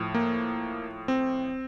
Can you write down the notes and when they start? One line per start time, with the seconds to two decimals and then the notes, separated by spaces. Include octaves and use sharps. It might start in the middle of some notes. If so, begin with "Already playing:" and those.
Already playing: A2 F3
0.15 A#3
1.08 C4